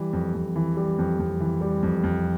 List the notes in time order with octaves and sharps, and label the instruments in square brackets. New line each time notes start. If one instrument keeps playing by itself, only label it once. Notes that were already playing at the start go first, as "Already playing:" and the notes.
Already playing: [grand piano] E3 G3
F2
F2
E3
G3
F2
F2
E3
G3
F2
F2